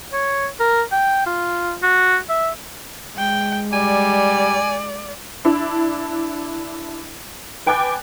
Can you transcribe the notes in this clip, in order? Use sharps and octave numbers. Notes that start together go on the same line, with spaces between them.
C#5
A#4
G5
F4
F#4
E5
G#3 G5
G3 D5 G#5
D4 E4
B4 G5 G#5 D6 F#6 A6